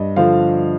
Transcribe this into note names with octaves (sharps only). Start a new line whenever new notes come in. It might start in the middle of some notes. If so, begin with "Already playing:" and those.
Already playing: G2 D#5
D3 F3 F5